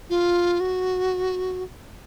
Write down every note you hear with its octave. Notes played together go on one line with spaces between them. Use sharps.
F4
F#4